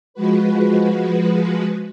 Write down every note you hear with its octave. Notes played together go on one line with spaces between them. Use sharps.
F3 G#3 F#4 B4